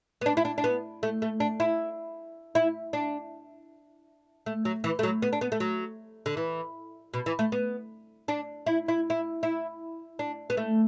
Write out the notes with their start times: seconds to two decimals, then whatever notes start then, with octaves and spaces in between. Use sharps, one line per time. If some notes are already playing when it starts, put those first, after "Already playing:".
0.21 B3
0.26 D4
0.37 E4
0.45 D4
0.58 D4
0.64 B3
1.03 A3
1.22 A3
1.40 D4
1.60 E4
2.55 E4
2.93 D4
4.46 A3
4.65 F#3
4.84 E3
4.99 A3
5.03 F#3
5.22 B3
5.33 D4
5.41 B3
5.52 A3
5.60 F#3
6.26 D3
6.37 E3
7.14 B2
7.26 E3
7.39 A3
7.52 B3
8.28 D4
8.66 E4
8.88 E4
9.10 E4
9.43 E4
10.19 D4
10.50 B3
10.57 A3